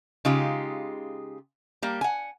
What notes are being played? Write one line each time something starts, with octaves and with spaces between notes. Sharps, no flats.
C#3 G#3 D#4 F4 G4
G3 A#3
F#5 G#5